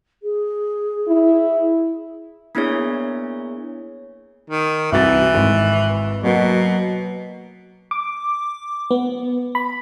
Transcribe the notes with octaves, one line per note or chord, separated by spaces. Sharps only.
G#4
E4
A#3 B3 D4 E4 G#4 C#5
D#3
C2 E3 F#4 A6
G#1
B2 F#3 A#3
D6
B3
B5